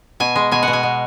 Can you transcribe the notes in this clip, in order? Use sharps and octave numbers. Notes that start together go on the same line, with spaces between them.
B2 G#5
G#3
B2 G#5
B2 F#5
G#5
B2